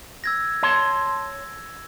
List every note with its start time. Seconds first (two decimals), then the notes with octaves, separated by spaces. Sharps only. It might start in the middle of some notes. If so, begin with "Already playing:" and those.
0.24 E6 G#6 A#6
0.63 C#5 A5 C6